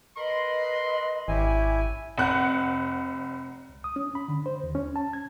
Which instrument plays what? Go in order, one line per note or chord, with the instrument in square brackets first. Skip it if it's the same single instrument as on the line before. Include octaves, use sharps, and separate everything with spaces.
[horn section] A#4 B5 C6 [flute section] B4 D#5
[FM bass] G#1 [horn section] C#4 D4 G4 [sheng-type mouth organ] E4 G#5
[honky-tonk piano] F1 F#5 F#6
[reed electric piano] C#2
D#6
C#4
B5
D3
C5
D#2
C#4
A5
G#6